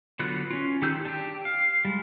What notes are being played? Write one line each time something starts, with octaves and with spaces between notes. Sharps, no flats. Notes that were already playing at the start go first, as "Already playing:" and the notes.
D3 F#3 B3 F4 F#6
C#4 F4
D#3 G4 G#4 E6 G6
D4 G4
F5
G3 G#3